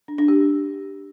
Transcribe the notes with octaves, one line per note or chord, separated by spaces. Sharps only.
D4
D4
G4